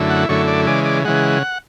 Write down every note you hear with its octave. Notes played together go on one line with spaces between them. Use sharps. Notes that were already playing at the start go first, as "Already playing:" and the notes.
Already playing: F#2 D3 A3 E4
F#5
F#2 D3 A3 E4 C#5
D5
C#3 E3 G#3 D5
D5
C#3 E3 G#3 F#5